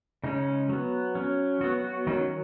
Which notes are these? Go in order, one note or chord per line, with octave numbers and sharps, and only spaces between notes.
C#3 G#3 C#4 D#4
F#3 B3
F#3 C#4
F#3 B3 F#4
F#4
D#3 F#3 C#4 D#4